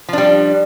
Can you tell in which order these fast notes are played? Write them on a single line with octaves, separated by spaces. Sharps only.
F3 D4 G3